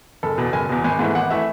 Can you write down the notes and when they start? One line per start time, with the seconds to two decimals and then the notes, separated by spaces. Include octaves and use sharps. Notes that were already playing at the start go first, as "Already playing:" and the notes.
0.23 F#1 A4
0.38 E2 B2
0.53 F#1 G#5
0.69 E2 B2
0.84 G#1 G#5
0.99 G#2 E3 A3
1.15 G#1 F#5
1.30 E3 A3 E5